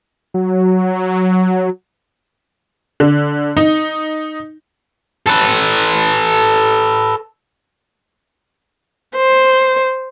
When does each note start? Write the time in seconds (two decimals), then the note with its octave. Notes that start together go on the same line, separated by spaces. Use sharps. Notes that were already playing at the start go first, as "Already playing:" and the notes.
0.34 F#3
3.00 D3
3.57 D#4
5.26 A4 B4
9.16 C5